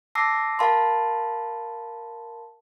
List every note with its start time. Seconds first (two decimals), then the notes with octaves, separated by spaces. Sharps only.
0.15 A5 D6 E6 A#6 C7
0.59 A#4 F5 A5 B5 C6